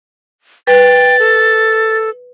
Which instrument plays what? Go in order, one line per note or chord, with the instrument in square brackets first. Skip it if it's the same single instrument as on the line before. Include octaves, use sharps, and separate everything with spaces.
[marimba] B4 [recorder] G5 [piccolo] A6
[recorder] A4